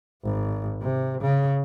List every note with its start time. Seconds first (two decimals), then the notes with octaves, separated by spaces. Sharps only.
0.23 G#1
0.82 C3
1.21 C#3